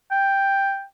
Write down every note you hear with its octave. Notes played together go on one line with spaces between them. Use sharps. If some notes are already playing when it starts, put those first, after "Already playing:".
G5